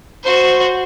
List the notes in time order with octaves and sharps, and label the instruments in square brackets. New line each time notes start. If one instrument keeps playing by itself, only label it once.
[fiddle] F#4 C5